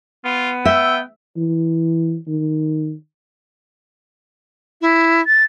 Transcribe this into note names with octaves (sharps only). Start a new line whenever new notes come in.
B3 F4
E5 G5 E6
E3
D#3
E4
A6